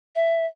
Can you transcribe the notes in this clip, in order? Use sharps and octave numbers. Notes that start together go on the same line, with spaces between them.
E5